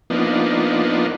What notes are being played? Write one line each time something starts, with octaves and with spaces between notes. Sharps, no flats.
F3 A#3 B3 D4 D#4